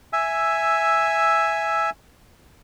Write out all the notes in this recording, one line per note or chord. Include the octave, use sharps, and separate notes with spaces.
E5 G#5 E6